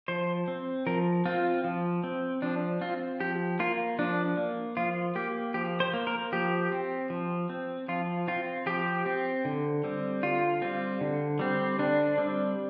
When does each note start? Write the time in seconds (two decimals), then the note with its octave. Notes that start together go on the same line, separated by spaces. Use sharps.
0.08 F3 C5
0.48 C4
0.87 F3 A#4
1.26 C4 F4
1.64 F3
2.04 C4
2.42 F3 D4
2.81 C4 F4
3.20 F3 G4
3.59 A#3 F4
3.99 F3 D4
4.37 A#3
4.77 F3 F4
5.15 A#3 G4
5.54 F3 G4
5.80 C5
5.94 A#3
6.07 A#4
6.32 F3 G4
6.72 C4
7.10 F3
7.49 C4
7.88 F3 F4
8.28 C4 F4
8.66 F3 G4
9.06 C4
9.45 D3
9.84 G3 C4
10.23 D3 F4
10.62 G3 C4
11.01 D3
11.39 G3 C4
11.79 D3 D4
12.18 G3 C4